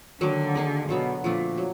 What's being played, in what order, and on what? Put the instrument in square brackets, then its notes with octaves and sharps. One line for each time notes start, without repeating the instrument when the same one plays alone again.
[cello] D3 [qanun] D#3 F#3 A#3
[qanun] A#3 D#4 G#4
[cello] B2 [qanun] D3 F#3 B3
[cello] A#2 [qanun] F3 A3 D4
[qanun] F#3